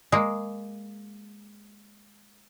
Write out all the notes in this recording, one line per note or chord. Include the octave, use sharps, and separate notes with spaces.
G#3 A#3